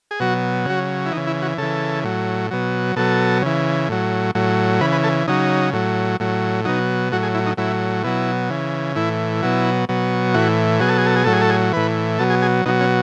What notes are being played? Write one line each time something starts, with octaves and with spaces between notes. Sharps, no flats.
G#4
B2 F#3 F#4
C#3 F#3 F#4
E4
E3 D#4
C#3
E4
F#4
C#3 E3 A4
A2 F#3
B2 F#3
B2 F#3 A4
C#3 E3
A2 F#3
A2 F#3
C#3 E3 B4
B4
A4
C#3 F#3 D#4
A2 F#3
A2 F#3
B2 F#3 D#4
A2 F#3 F#4
G#4
E4
D#4
A2 F#3 E4
B2 F#3 E4
C#3 E3
A2 E3 E4
B2 F#3 E4
B2 F#3
A2 E3 F#4
B2 F#3 G#4
A4
G#4
A4
G#4
A2 F#3 A4
G#4
A4
G#4
A2 E3 B4
B2 F#3 A4
G#4
G#4
B2 F#3 D#4
C#4